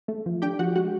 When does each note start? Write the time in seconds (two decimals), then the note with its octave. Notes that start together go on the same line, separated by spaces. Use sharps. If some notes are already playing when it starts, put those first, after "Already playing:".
0.08 A3
0.26 F3
0.42 D4 G4 G5
0.59 F3 F#4 F#5
0.75 G#3 F#4 F#5